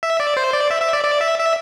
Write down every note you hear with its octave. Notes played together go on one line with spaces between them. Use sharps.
E5
D5
C5
D5
E5
E5
D5
D5
E5
E5